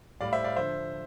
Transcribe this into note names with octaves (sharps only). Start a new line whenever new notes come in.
A2 G3 D5 F5
C5 E5
D5 F5
D3 F3 C5 E5